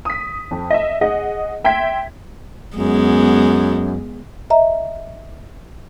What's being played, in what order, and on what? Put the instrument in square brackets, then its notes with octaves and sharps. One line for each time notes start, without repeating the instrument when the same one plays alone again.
[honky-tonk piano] D#6 B6
F2
D#5 E5
G#4 D#5 F#5
E5 G5 C6 G#6 B6
[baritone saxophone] F#2 [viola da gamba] G#3 B3
[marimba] D#5 E5 A#5